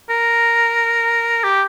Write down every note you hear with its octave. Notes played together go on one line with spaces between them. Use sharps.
A#4
G4